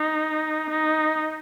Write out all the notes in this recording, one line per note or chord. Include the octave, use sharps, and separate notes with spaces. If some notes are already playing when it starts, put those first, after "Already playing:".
Already playing: D#4
D#4